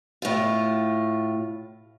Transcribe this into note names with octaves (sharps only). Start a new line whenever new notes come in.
A2 F4